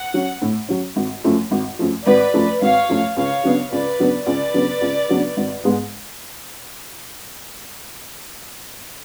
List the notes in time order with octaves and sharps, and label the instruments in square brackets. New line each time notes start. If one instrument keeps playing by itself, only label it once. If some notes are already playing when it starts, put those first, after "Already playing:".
Already playing: [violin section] F#5
[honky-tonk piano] F#3 C#4
A2
F#3 C#4
G#1
F#2 F3 A3
G#1
F#2 F3 A3
[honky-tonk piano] G#1 [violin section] B4 D5
[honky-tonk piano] F#2 F3 A3
[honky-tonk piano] G#1 [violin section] C#5 F5
[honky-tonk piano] F#2 F3 A3
[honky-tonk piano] C#2 [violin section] C#5 F5
[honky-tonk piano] C#3 F#3 B3 D4
[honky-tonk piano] C#2 [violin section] B4 D5
[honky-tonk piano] C#3 F#3 B3 D4
[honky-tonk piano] C#2 [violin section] B4 D5
[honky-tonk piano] C#3 F#3 B3 D4
C#2
C#3 F#3 B3 D4
G#1
G#2 G#3 B3